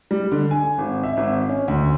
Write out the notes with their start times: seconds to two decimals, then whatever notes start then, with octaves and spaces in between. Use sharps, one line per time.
0.11 G3
0.32 D3
0.51 G#5
0.78 G#1
1.03 E5
1.17 G#1
1.49 C#4
1.68 D2